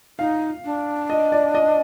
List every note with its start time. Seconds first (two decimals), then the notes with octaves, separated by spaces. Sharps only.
0.19 D#4 F5
0.65 D4
1.10 D#5
1.32 D5
1.55 D#5